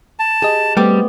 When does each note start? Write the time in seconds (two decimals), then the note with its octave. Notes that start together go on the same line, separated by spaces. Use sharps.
0.19 A5
0.42 G4 G#4 D#5
0.77 G3 A3 B3 C4 G5 D6